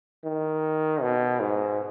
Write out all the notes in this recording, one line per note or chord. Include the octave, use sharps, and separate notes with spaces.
D#3
B2
G#2